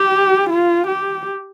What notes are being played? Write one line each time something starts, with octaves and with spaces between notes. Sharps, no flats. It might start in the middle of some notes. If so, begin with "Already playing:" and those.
Already playing: G4
F4
G4